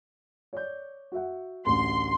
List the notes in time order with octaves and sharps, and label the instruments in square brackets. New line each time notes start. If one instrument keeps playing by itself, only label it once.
[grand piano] C#5 D5 G6
F#4 E5 F#5
[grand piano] A1 D2 [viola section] C6